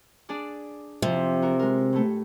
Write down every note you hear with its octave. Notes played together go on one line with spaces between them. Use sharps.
D4 G#4 D5
F2 C3 F3
F#4 A#4
G#3 A#4
A2 A3